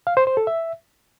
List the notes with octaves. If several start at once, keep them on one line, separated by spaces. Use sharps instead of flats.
F5
C5
C5
A4
E5